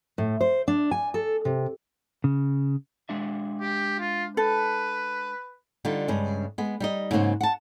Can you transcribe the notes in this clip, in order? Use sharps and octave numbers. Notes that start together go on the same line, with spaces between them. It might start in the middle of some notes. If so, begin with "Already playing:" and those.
A2
C5
D4
G#5
A4
C3
C#3
G#3 D4 E5
G4
F4
A4 B4
D3 G3 D#4 F4
G2 C#3 G#3
G#3 B3
G3 D#4 D#5
G#2 C#3 F#3 A#3 C5 F#5
F#5 A5